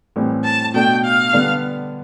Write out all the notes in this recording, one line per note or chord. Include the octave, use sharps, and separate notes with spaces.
A2 E3 G3 C4
A5
B2 A3 D4 G5
F5
D3 G3 B3 D4